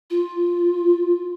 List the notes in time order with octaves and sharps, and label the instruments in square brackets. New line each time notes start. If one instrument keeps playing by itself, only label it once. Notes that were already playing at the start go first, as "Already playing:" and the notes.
[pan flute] F4